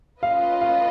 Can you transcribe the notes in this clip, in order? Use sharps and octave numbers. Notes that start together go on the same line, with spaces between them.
C#4 F4 B4 D#5 F5
F5